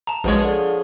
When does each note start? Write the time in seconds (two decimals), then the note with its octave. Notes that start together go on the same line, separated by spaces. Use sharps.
0.07 A5 A#5
0.24 A#1 B2 F3 G#3 G#4 C#5
0.44 D3